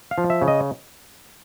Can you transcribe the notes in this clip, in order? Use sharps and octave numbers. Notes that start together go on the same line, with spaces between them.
F5
F3
E5
C#3
D#5